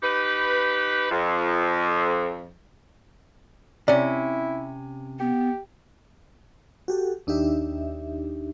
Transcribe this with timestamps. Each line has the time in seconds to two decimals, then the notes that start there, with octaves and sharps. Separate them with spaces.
0.03 D#4 G4 B4
1.11 F2
3.88 C3 C#4 E4 D5
5.20 B3 G4
6.88 F#4 G4 A4
7.27 D#2 D4 D#4 G4 E5